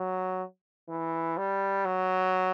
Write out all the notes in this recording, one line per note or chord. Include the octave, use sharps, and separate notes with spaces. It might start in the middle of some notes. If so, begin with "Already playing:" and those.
Already playing: F#3
E3
G3
F#3